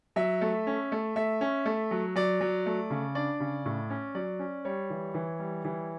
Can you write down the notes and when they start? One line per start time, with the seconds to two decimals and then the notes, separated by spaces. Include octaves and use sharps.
0.16 F#3 E5
0.41 A3
0.67 C#4
0.92 A3
1.16 A3 E5
1.41 C#4
1.66 A3
1.91 F#3
2.16 F#3 D5
2.41 F#3
2.66 A3
2.90 C#3
3.15 D4 D5
3.40 C#3
3.65 A2
3.90 C#4
4.15 F#3 D5
4.39 C#4
4.65 G3 C#5
4.90 E3
5.14 E3
5.39 G3
5.65 E3